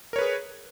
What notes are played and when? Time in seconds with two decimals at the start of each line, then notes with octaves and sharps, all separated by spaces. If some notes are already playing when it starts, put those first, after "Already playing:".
0.13 A#4
0.16 C#5
0.19 B4
0.21 G#4